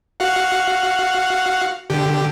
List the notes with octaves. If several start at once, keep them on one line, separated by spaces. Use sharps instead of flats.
F#4 F5 F#5
D3 G4